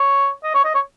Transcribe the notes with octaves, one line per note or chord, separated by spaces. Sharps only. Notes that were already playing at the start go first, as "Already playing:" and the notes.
Already playing: C#5
D#5
C#5
D#5
C#5